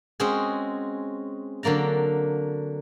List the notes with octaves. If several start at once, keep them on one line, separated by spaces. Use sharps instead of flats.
G#3 C4 C#4 F#4 G#4
D3 F#3 A#3 D5 A#5